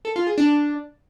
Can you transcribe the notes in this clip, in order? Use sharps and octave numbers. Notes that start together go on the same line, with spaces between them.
A4
F4
G#4
D4